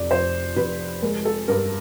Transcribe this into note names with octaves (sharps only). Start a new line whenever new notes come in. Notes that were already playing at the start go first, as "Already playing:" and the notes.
Already playing: F1 F2 D5
F2 C5
F1 B4
G#3 A#4
A4
G2 A#4